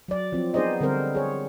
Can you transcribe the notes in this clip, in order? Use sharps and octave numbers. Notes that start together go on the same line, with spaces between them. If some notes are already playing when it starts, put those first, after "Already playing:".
F#3 D5
F3 C4
B3 D#4 G#4 C5 D5 D#5
D3 G3 C4 A#4 C5
G#4 C#5